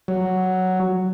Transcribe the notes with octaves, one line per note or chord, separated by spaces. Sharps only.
F#3